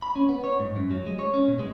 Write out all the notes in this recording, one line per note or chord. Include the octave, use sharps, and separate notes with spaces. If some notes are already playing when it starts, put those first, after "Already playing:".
B5
C#4
B3
C#5
G#2
F#2
F#3
G#3
C#5
C#4
B2
G#3